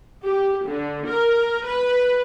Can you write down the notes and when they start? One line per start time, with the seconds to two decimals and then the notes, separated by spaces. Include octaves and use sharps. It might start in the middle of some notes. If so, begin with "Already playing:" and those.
0.23 G4
0.65 D3
1.06 A#4
1.65 B4